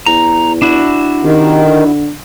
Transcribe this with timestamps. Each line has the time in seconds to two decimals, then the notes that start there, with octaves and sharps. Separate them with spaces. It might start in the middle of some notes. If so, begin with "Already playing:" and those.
0.06 E2 A#5
0.62 D4 E4 F#4
1.24 C3 D#3
1.64 D3